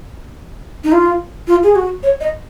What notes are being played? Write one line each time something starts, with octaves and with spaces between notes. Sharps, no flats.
D#4
F4
F4
G#4
F#4
C#5
D#5